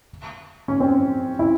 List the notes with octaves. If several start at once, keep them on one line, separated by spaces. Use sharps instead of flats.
C#4
C4
E4